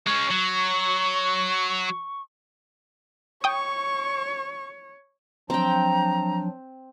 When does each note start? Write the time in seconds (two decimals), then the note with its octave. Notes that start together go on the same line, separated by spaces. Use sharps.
0.06 G#3 C#4 C#6
0.30 F#3
3.44 C#5 G5 C#6 D#6
5.50 F3 F#3 C4 D4 G5 A#5